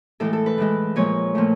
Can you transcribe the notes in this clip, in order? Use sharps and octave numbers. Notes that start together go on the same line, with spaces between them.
A2 E3 G#3 A4
A4
B4
A2 E3 G#3
A#2 F3 G#3 C#5
A#2 F3 A3